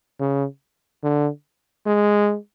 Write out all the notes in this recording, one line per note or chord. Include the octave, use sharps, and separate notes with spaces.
C#3
D3
G#3